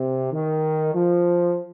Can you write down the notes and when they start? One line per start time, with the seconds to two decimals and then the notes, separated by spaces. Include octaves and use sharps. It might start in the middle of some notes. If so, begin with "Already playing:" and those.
Already playing: C3
0.32 D#3
0.94 F3